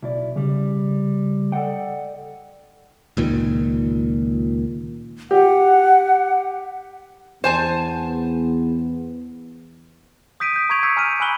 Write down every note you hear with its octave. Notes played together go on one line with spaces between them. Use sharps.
B1 E4 D5
C#3 G3
A4 D5 D#5 F#5 G5
C#2 A#2 D#3
G4 F#5
E2 B3 C5 G#5 A5
D#6 G6 B6 D7 D#7
G6 B6
A#5 C#6 D6 G#6 D7 F7
E6 G6 B6 C#7
G#5 A#5 F6 G6 D7 D#7
G#5 B5 E6 F#6 F#7 G7